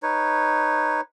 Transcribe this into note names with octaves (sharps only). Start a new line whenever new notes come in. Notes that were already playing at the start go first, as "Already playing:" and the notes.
D#4 B4 C#5